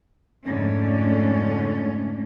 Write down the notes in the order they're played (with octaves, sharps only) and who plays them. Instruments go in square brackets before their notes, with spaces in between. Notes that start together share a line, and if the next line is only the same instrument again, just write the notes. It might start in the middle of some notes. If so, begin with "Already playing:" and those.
[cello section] F2 G#2 D3 A3 C#4